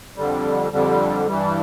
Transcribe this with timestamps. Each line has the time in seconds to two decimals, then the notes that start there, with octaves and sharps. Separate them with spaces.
0.16 F2 D3 G3
0.72 F2 D3 G3
1.26 G2 E3 G3